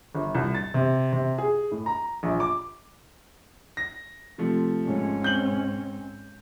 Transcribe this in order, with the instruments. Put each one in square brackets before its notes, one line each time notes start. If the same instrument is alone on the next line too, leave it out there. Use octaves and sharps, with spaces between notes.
[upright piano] G1
C2
A6
C3
C3
G#4
A2
A#5
A#1
D6
A#6
C3 F3 A3
[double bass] G#2 C#4
[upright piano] C4 G6 F#7